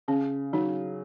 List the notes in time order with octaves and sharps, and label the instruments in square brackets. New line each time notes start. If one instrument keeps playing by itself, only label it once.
[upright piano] C#3 [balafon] C#4
[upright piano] F#3 C#4 [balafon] D#4